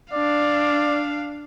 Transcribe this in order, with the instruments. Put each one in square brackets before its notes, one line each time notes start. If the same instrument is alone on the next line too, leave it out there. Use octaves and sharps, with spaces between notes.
[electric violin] D4 F5 [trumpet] D5